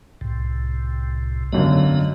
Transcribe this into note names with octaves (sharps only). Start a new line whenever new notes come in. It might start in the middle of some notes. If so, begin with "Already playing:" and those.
C2 A2 C3
G#1 F#2 D3 B3 D#5